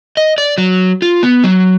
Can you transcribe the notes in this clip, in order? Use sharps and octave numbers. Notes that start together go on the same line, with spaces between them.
D#5
D5
F#3
F4
B3
F#3